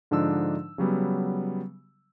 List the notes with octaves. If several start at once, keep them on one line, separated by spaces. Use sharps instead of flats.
G#2 D3 F3 D4 D#4 E6
C#3 F#3 G3 B3